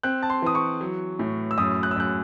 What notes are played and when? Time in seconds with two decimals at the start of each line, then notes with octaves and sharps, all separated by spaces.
0.03 C4 F#6
0.23 A5
0.30 C6
0.42 E3 D#6
0.55 C#6
0.81 F#3
1.19 A2
1.51 E6
1.58 F#2 D#6
1.83 F#6
1.91 E6
1.96 F#2 F#6